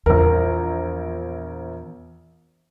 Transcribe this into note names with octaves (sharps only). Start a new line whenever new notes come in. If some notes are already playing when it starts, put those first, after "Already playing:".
A#1 E2 A#4